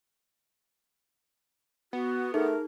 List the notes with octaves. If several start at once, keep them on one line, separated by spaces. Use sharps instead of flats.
B3 F#4
A3 D#4 G#4 A#4